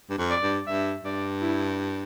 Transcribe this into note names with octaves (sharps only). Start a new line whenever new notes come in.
G2
F2
D5
G2
G2 E5
G2 D5
E4